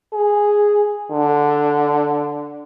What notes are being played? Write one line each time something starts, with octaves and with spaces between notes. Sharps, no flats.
G#4
D3